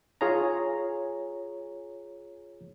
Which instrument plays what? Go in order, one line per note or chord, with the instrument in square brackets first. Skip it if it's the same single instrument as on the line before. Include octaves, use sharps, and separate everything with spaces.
[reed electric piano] F4 G#4 C#5 G#5 A#5